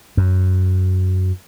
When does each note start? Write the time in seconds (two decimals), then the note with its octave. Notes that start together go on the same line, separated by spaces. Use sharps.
0.17 F#2